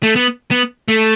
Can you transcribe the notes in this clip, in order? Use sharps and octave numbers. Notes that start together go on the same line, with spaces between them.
A3
B3
B3
A3